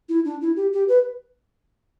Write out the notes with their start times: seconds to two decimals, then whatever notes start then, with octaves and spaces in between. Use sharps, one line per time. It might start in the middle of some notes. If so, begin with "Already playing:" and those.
0.09 E4
0.25 D4
0.41 E4
0.56 G4
0.73 G4
0.88 B4